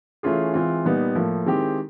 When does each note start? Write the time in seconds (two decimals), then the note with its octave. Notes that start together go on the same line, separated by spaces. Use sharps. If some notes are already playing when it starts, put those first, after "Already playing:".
0.23 E3 A3 C#4 F4 G#4
0.53 E3 G#3 C4 F4
0.85 A#2 G3 B3 D#4
1.15 A2 F3 A#3
1.46 D#3 G#3 C4 E4 G4